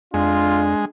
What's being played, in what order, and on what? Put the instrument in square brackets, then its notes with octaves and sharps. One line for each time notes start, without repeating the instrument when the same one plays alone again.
[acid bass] F2 [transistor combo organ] G#3 [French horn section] D4 [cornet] F4